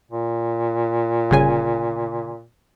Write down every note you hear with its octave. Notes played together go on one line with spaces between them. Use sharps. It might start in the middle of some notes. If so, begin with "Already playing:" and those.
A#2
G1 C#3 G#5